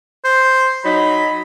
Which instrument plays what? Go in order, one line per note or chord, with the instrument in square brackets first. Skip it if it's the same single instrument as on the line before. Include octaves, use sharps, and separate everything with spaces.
[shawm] C5
[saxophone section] F#3 D#4 [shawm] B5